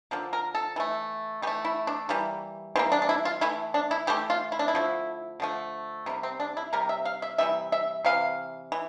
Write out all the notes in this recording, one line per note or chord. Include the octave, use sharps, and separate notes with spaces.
D3 F3 A#3
A#4
A4
E3 A3
E3 A3 G4
E4
D4
E3 G3 A#3
E3 G3 A#3 C4
D4
D4
E4
F4
E3 A3 E4
D4
E4
E3 A3 G4
F4
E4
D4
E4
D3 F3 A3
D3 F3 A3
C3 G3 A#3
C4
D4
E4
C3 G3 A#3 A#4
E5
F5
E5
C3 E3 G3 E5
E5
C3 E3 F5
E3